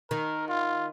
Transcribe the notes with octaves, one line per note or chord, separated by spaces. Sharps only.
D#3 A#4
F4